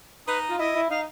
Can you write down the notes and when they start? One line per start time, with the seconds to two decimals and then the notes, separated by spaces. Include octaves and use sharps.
0.27 D#4 B4
0.49 F4
0.59 E4 D#5
0.74 E4
0.90 D#4 F5